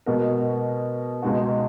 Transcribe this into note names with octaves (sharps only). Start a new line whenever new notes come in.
B2 G#3 B3 F#4 A#4
C#2 B2 G#3 D#4 F#4